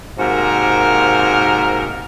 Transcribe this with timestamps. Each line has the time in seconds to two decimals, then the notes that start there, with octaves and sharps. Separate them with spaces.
0.19 G#2 C3 A#3 F#4 A#4